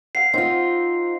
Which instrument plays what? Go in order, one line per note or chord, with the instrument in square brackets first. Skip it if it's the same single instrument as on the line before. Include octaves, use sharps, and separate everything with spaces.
[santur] F5 F#5 [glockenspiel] C7
[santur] C4 [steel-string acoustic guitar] D#4 F4